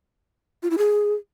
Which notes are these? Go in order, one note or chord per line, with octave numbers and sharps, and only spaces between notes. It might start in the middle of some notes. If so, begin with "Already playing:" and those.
F4
E4
G#4